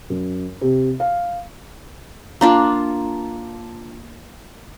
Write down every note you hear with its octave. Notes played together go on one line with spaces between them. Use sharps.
F#2
C3
F5
A#3 D4 F4